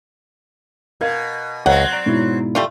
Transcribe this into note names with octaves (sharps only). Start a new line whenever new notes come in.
B2 A#4 F5 G#6
C#2 F#3 C4 F#5
D5 A#5
G#2 B2 E4
G3 A3 F4